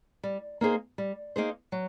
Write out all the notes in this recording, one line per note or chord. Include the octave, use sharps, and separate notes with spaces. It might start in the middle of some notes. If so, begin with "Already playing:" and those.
G3
A#3 D#4 G#4 C5
G3
A#3 D#4 G#4 C5
F#3